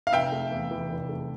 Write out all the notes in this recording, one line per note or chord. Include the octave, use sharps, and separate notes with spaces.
F5
F1 E5 G5
A3
E2
E3
F1
A3